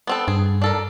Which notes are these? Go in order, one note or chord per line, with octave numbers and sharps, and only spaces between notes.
B3 C4 A4
G2 G#4
D4 A4 A#4